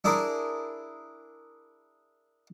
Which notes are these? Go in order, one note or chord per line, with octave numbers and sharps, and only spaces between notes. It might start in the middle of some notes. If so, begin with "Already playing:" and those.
D4 E4 G#4 A#4